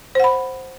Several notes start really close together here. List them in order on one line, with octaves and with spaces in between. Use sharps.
C5 F#5 B5